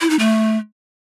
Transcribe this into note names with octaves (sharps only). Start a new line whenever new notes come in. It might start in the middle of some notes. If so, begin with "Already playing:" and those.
E4
D#4
A3